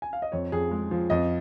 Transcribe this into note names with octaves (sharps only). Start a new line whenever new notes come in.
G#5
F5
D#5
F2 C#5
F2 G#4
G#3
F3
F2 D#5